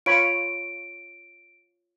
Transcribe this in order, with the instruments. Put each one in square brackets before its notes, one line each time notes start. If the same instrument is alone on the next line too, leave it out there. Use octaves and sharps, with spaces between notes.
[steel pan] F4 C#5 B5 [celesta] D7